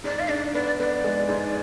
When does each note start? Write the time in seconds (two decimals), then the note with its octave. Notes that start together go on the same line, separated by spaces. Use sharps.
0.04 G#2 D5
0.19 F5
0.29 D4 D5
0.54 B3 D5
0.79 B3 D5
1.04 G#3
1.29 G#2